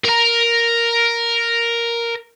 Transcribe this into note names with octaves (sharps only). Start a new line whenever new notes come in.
A#4 A#5